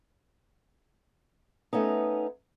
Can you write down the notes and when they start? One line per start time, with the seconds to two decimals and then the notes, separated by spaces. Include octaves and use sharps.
1.73 A3 B3 C#4 D#4